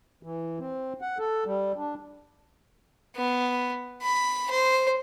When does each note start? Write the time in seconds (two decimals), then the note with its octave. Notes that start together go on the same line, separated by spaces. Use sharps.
0.23 E3
0.59 C4
1.02 F#5
1.18 A4
1.46 G3
1.76 D4
3.16 B3
4.02 B5
4.50 C5